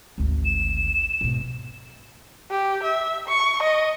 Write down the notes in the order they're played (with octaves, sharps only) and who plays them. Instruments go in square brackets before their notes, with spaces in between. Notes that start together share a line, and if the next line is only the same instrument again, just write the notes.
[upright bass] G#1 D2
[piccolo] E7
[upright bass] G#2 B2
[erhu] G4
E5
C#6
D#5